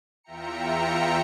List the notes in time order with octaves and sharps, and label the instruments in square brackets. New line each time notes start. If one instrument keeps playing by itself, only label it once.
[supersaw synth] E2 F4 E5 G5 A#5 C#7